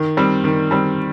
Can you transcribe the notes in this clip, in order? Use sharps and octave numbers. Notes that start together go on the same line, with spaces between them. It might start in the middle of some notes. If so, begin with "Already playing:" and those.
Already playing: D#3
G3 C4
D#3
G3 C4